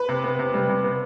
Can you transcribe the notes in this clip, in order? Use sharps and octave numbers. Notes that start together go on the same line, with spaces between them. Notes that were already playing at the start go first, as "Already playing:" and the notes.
Already playing: B4
C3
B3
C3
G3
C3
B3